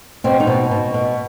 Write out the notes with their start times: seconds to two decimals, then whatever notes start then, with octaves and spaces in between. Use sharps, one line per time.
0.24 B2 C4
0.40 D#4
0.47 B2
0.71 B2
0.94 B2